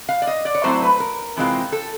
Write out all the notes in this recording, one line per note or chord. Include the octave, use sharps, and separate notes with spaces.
F5
D5
D#5
D5
C#5
A2 F#3 A3 C4 E4 C5
B4
A#4
C3 E3 G#3 C4 F4
A4